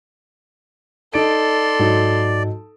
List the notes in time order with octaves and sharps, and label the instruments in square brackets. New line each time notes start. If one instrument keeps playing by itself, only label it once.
[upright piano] D#4 D7 [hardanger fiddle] A4 C6 [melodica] D5
[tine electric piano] G#2 [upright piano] F#3 D#4